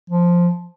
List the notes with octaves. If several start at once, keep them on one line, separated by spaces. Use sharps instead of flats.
F3